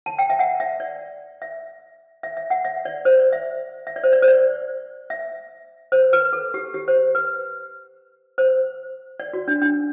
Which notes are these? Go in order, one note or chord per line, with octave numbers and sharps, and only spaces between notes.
A5
G5
E5
F#5
E5
D5
E5
E5
E5
F#5
E5
D5
C5
D5
E5
E5
D5
C5
D5
C5
D5
E5
C5
B4
A4
G4
G4
C5
B4
C5
D5
F#4
D4
D4